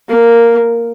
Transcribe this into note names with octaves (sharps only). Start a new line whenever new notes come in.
A#3